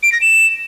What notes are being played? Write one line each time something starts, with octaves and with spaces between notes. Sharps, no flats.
D7
A#6
E7